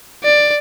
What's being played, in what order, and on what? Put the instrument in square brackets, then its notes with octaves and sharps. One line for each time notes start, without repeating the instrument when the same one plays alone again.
[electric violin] D5